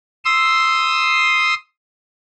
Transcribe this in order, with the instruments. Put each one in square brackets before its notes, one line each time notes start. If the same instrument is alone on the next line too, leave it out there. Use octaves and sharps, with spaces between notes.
[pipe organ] C6 D#6 E6